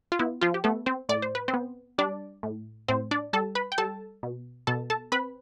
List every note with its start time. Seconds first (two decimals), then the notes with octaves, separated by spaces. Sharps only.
0.12 F4
0.19 B3 E4
0.41 F3 F4
0.54 G4
0.64 A3 B3 A4
0.86 C4 C5
1.09 A2 D5
1.22 C5
1.35 B4
1.48 C4 C5
1.54 B3
1.98 G3 D4 D5
2.43 A2
2.88 A2 C4 C5
3.11 D4 D5
3.33 G3 A4 A5
3.55 B4 B5
3.72 G5
3.78 G3 A4 A5
4.23 B2
4.67 B2 A4 A5
4.90 A4 A5
5.12 C4 B4 B5